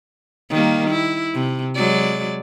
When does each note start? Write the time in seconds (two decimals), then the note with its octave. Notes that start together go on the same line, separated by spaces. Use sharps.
0.50 D#3 G3 A#3
0.90 E4
1.34 C3
1.76 F#3 G#3 D5